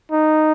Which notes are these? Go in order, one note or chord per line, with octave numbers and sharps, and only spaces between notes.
D#4